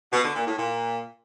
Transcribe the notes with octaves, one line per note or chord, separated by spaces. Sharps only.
B2
D3
A#2
A2
A#2